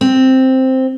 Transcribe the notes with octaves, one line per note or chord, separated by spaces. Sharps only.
C4